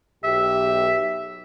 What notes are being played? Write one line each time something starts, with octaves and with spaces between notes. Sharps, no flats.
B1 G4 E5